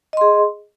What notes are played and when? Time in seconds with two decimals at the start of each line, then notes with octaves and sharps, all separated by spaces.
0.13 D#5
0.17 C6
0.21 G#4